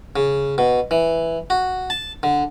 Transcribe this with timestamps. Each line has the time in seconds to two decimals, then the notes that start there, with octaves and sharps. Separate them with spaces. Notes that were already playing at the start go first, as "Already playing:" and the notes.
0.16 C#3
0.58 B2
0.91 E3
1.50 F#4
1.90 A5
2.23 D3